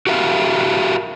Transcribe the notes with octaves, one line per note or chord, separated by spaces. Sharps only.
F#4 G4 A#4 E5 F5